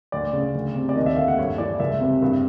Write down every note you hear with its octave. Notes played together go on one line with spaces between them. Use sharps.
D2 D5
C#3
D2
C3
D5
D#2 D#5
E5
D3 F5
F#5
G2 C#5
E3 D5
C#2 E5
C3
G2